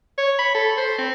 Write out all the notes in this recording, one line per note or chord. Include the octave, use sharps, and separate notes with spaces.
C#5
B5
A4
C5
C4